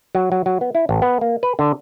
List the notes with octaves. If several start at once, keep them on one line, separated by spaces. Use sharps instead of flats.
F#3
F#3
F#3
B3
E4
A1
B3
A#3
B4
D3